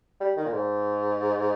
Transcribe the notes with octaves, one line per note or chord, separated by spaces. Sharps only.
G3
D#3
A#2
G#2